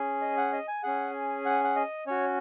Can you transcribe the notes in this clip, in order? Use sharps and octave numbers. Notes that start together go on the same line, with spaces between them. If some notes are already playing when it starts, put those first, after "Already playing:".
Already playing: C#4 G#4
D#5
F#5
D#5
G#5
C#4 G#4 F#5
F#5
F#5
D#5
C#4 F#4 C#5